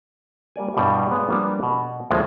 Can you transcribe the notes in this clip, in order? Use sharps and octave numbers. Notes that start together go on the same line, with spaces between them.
G3 A#3 D5 G#5
G2 B2 E3 G3
G#3 B3 C#5 D5 F5 G#5
F3 G3 A#3 B3 D4
B2
D2 A2 F3 G#3 A#3 D4